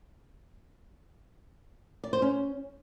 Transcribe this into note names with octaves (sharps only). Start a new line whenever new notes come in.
D5
C5
C#4